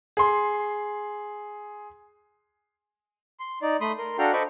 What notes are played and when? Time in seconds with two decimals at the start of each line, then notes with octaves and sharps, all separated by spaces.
0.17 G#4 C6
3.40 C6
3.62 D#4 D5
3.81 A3 B5 C6 D#6
3.98 A#4 C6
4.18 D4 F#4 A4 F5 G5 A#5
4.33 A4 C5 D#5 B5 C#6 D6